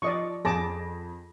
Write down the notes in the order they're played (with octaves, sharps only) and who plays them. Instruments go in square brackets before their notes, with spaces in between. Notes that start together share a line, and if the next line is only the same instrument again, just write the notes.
[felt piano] F3 [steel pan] D5 D#5 C#6
[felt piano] F2 A#6 [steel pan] G#4 A5 D6